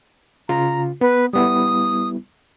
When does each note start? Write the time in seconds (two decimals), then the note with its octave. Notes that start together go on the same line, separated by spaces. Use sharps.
0.49 C#3 F4 A#5
1.01 B3 B4
1.33 G3 B3 E4 D#6